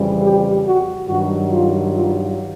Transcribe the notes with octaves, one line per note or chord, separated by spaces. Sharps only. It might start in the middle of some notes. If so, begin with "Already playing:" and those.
Already playing: F2 C#3 E3 G3
G4
F#4
G2 D#3 F#3 F#4
F4
F4